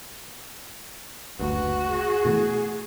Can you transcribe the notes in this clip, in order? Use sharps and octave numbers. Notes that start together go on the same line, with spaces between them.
F#1 D2 G2 F#4 B4
G#4
B2 E3 A3